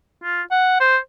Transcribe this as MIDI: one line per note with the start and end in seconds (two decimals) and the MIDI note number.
0.23 0.42 65
0.51 0.77 78
0.80 0.97 72